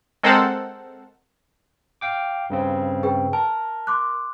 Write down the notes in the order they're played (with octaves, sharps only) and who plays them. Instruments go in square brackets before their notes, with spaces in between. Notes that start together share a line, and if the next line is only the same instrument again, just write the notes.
[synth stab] G#3 C4 A4 A#4 C5 F#5
[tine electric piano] F5 G5 D6
G2 C#3 C4
[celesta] G#4 B4 G5
[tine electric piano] A#4 [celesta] A5
[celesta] C6 D6 F#6